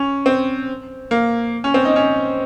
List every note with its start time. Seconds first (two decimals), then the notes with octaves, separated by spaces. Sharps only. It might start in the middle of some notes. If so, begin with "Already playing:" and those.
Already playing: C#4
0.26 C4
1.11 A#3
1.64 C#4
1.74 C4
1.85 D#4
1.96 C#4